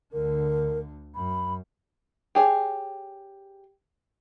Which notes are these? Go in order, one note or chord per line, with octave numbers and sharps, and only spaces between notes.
D2 D3 A#4
F#2 B5
G4 G#4 C#5